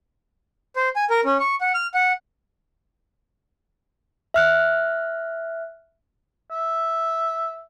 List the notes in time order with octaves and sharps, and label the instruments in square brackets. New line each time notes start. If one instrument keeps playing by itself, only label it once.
[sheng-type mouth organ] C5
G#5
A#4
C#4
C#6
F#5
F6
F#5
[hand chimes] E5 F6 F#6
[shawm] E5